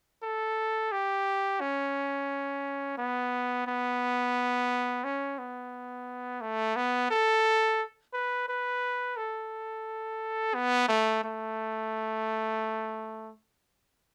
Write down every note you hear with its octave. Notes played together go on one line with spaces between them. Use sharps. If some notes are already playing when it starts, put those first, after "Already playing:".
A4
G4
C#4
B3
B3
C#4
B3
A3
B3
A4
B4
B4
A4
B3
A3
A3